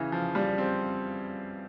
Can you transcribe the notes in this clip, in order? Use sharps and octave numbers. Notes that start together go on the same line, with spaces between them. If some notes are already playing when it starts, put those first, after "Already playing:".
Already playing: C#3 E3
F3
G3
C4